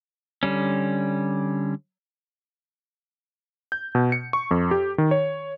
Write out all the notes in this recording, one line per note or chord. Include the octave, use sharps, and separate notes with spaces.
D3 G3 C#4
G6
B2
C#7
C#6
F2
G4
D#3
C#5